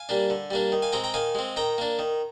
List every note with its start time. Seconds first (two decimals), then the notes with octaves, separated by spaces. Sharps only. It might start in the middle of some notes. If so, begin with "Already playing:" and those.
Already playing: F5 G#5
0.09 G3 A#3 D4
0.30 D3
0.51 G3 A#3 D4
0.72 D#3
0.82 F5 G#5
0.92 G#3 C4 G5 A#5
1.04 G5 A#5
1.14 D#3 F5 G#5
1.35 G#3 C4
1.57 D#3 G5 A#5
1.78 A#3 D4
1.99 D#3